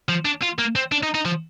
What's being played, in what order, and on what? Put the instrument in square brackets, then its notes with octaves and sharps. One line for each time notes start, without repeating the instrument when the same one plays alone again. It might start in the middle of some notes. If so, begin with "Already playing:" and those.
[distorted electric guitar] F3
D4
F4
A#3
C4
D4
D#4
D#4
F3